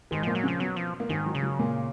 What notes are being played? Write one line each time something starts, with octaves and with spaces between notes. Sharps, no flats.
G#2 D#3 G#3
A#2 F3 A#3
F#3
C#3 F3 C#4
B2 F#3 B3
F3
A#3
G#2 D#3 G#3
F#3
C#3
F#3
A#2 A#3